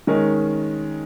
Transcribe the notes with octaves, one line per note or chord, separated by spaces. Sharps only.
D#3 G#3 C#4 A#4